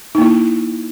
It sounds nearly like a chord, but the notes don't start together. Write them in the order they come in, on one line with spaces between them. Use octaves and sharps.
D#4 A#3 E4